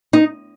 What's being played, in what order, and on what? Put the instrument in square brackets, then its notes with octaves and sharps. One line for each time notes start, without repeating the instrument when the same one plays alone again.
[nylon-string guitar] D#4